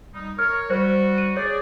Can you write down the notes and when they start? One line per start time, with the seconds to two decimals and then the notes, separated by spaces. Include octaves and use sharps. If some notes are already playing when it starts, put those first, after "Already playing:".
0.14 G3 D#4
0.39 A#4 C#5 F6
0.70 G3 F#4 C5
1.18 D#7
1.37 G#4 C#5 D5